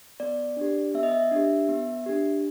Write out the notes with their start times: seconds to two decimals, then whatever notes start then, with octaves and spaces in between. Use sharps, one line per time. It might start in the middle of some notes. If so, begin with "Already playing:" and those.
0.20 B3 D5
0.57 D4 G4
0.94 B3 E5
1.03 D#5
1.11 E5
1.31 D4 G4
1.69 B3
2.06 D4 G4